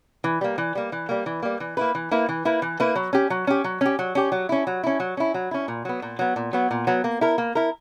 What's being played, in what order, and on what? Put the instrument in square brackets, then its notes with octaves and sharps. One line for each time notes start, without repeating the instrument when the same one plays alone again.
[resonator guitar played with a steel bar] E3
G3 A#3
E3
G3 A#3
E3
G3 A#3
E3
G3 A#3
E3
A#3 E4 B4
E3
A#3 E4 B4
E3
A#3 E4 B4
E3
A#3 E4 B4
F#3
C#4 G4
F#3
C#4 G4
F#3
C#4 G4
F#3
C#4 G4
F#3
C#4 E4
F#3
C#4 E4
F#3
C#4 E4
F#3
C#4 E4
A#2
F#3 B3
A#2
F#3 B3
A#2
F#3 B3
A#2
F#3 B3
A#3
E4 A#4
A#3
E4 A#4